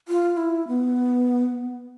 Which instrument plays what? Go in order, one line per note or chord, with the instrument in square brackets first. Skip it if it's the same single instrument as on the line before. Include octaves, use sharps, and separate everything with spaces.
[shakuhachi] F4
E4
B3